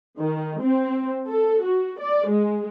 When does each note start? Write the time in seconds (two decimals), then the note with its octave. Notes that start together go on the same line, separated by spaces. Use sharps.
0.17 D#3
0.60 C4
1.27 A4
1.63 F#4
1.99 D5
2.28 G#3